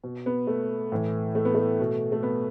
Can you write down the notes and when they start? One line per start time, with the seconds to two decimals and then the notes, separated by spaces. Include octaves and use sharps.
0.04 B2
0.26 B3
0.47 A3
0.92 A2 E3
1.35 A3
1.45 B3
1.55 A3
1.80 B2
2.12 A3
2.23 B3